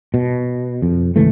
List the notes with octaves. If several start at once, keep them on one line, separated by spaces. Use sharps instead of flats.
B2
F2
G#1 C#2 E3 A3